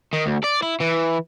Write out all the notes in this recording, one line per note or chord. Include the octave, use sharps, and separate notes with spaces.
D#3
D2
D5
E4
E3